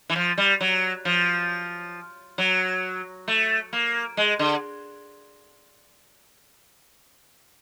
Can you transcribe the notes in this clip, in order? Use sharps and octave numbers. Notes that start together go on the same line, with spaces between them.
E3
F3
G3
F#3
F3
F#3
A3
A#3
G#3
D3